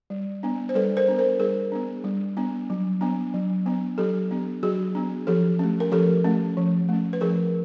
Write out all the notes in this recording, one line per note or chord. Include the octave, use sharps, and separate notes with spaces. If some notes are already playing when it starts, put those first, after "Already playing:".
G3
B3 D4
C5
G3 A4 B4
A#4 C5
B3 D4
A#4 C5
G3 G#4 A#4
B3 D4
G3
B3 D4
F#3
B3 D4
F#3
B3 D4
F#3 G4 A4
B3 D4
F#3 F#4 G#4
B3 D4
F3 G4 A4
A3 C#4
A#4
F3 G4 A4
A3 C#4
F3
A3 C#4
B4
F3 G#4 A#4